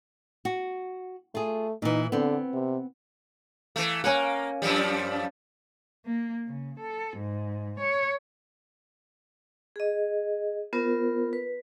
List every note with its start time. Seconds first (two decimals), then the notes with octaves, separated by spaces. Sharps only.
0.45 F#4
1.35 A3 F4 G#4
1.82 A#2 E3 D#4
2.12 D3 B3 C4
2.53 C3
3.76 E3 A3
4.04 A#3 C#4 C#5 F#5
4.62 F#2 F3 G3
6.06 A#3
6.46 C#3
6.79 A4
7.17 G#2
7.80 C#5
9.76 G#4 D#5
10.73 B3 F4 A#4 C5
11.33 B4